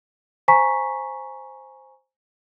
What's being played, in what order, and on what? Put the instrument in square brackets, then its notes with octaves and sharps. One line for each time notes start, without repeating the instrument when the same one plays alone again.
[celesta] C5 G#5 A#5 C#6 B6